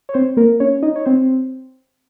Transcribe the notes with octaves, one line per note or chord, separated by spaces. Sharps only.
C#5
C4 C5
A#3 A#4
C#4 C#5
D#4 D#5
C#5
C4 C5